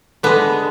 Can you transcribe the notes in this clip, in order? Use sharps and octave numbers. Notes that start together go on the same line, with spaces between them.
D3 G#3 B3